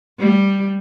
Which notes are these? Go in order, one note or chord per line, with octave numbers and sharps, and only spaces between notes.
G3